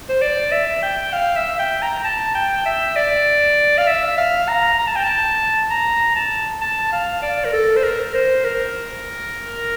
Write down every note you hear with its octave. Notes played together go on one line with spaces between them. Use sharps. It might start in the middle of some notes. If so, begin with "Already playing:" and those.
C5
D5
E5
G5
F5
E5
G5
A#5
A5
G5
E5
D5
F5
E5
F5
A#5
A#5
A5
G5
A5
A#5
A5
A5
F5
D5
A#4
A4
C5
A#4
C5
A#4